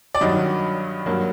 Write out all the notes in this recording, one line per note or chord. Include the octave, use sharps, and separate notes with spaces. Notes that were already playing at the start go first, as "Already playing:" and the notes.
D5
G2 D#3 F#3 D#5
G2 F#3 A#3